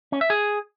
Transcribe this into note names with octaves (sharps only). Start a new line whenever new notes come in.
C#4
E5
G#4